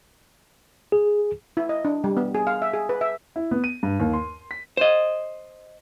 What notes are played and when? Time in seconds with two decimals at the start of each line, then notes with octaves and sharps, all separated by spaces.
0.92 G#4
1.57 E4
1.69 D#5
1.85 D4
2.04 G3
2.17 B3
2.35 G#4
2.47 F5
2.62 E5
2.73 G#4
2.89 B4
3.01 E5
3.36 E4
3.51 B3
3.64 D#7
3.83 G2
4.00 D#2
4.13 C6
4.51 B6
4.77 C5 D#5